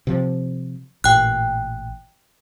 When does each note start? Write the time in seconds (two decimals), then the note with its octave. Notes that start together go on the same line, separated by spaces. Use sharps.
0.07 C3 F3
1.04 A1 A#2 G5 F#6